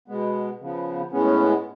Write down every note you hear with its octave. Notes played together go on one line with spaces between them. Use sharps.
B2 G#3 B3
C#3 F3 B3
A2 G#3 B3 C#4